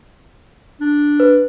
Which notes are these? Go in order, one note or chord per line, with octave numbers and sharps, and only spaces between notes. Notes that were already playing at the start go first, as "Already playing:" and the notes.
D4
B4